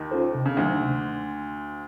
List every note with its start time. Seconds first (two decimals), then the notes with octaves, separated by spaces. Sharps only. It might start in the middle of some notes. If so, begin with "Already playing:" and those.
Already playing: D#2 D#3
0.11 C#4 F4 A4 C5
0.35 C3
0.46 C#3
0.57 D2 D3 D#3 F#3 A#3 D#4
0.81 C3